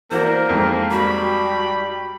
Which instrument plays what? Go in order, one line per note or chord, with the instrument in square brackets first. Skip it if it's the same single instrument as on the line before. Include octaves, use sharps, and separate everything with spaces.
[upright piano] E3 F#4 D5 [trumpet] A#3 [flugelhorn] A#4 [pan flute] C5
[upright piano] F2 G#2
[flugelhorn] G3 [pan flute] F#4 [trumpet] B5